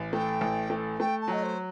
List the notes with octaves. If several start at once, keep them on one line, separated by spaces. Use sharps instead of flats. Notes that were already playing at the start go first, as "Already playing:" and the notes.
Already playing: A1
A3 G5
A1
A3
A3 G5
A5
F#3 D#5
C5